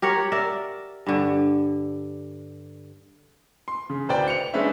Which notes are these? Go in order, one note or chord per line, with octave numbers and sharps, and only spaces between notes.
G4 A#4 C#5 F#5
A#4 D5 E5
G2 D3
C6
C#3
D1 B4 C5 D5 G5
C#7 F7
G#3 C#4 D4 B4 C5 E5